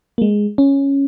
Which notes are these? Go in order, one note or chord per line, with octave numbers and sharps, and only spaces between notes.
A#3
G#3
C#4